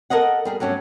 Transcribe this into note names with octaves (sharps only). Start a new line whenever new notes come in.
A4 A#4 C5 D#5 F#5
G3 G#4 A#4
G2 F#3 A3 C#4